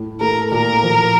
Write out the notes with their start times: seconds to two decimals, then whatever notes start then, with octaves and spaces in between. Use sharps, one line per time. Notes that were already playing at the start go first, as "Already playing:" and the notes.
Already playing: A2
0.21 A3 A#4
0.51 A#2 A#4
0.83 F3